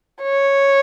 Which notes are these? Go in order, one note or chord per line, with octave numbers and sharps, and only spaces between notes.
C#5